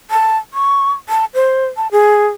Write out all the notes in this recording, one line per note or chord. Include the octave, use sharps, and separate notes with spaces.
A5
C#6
A5
C5
A5
G#4